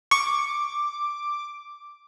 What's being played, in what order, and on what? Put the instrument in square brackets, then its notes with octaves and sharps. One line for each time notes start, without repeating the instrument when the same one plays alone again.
[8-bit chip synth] C#6 [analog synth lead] D6